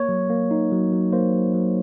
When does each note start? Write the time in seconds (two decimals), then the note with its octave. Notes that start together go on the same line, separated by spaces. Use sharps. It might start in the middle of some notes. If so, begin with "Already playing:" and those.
Already playing: A#3 C#5
0.09 F#3
0.30 A#3
0.51 D#4
0.72 F#3
0.93 F#3
1.13 A#3 C5
1.34 F#3
1.54 F#3